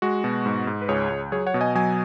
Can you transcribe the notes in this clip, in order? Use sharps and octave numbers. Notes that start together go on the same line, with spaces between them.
G#3 F#4
B2
G#2
G#2
B4
C#2 G#4 C#5
C#2
F#3 G#4 C#5
C#5 F#5
B2
D#5 G#5
F#3 D#5 G#5